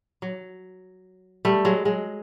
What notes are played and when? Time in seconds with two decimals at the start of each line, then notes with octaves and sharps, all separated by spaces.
0.22 F#3
1.45 G3 A3
1.65 F#3 G#3
1.85 F#3 G#3